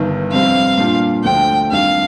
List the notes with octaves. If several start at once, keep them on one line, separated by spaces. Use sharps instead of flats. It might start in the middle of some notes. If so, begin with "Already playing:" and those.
Already playing: G1 G2 D#3
F1 F2 C3 G3 C4 F5
A#2 G3 D4 F4
D2 D3 F3 A3 G5
F2 D#3 G3 D4 F5